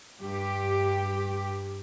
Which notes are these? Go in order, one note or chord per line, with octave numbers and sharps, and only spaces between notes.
G2 G4